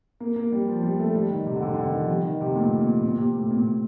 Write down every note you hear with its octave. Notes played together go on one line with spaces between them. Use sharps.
A#3
A#3
G3
F3
G3
A3
G3
D#3
C3
D3
C3
D3
D#3
F3
G3
D#3
C3
A2
A#2
A#2
A#2
C3
A#2
A2
A#2
A#2